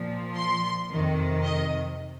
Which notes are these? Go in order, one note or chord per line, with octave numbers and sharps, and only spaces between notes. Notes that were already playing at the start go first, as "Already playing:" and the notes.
Already playing: A#2 F3
C6
F2 C3 D#3
D#5